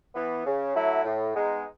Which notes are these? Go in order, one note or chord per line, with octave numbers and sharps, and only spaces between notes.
E3 B3
C#3
F#3 A3 E4
A2
G#3 B3 D#4